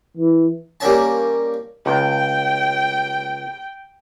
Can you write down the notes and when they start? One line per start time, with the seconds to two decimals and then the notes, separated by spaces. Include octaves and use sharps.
0.17 E3
0.80 G3 A#3 C#4 A5
1.86 C#2 G5